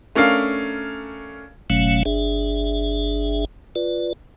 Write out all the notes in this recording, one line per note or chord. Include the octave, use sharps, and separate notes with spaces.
A3 C#4 D4 A#4 F5
F#1 B2 F#3 A3 C#4 F5
G1 D4 G#4 E5
F4 B4 D5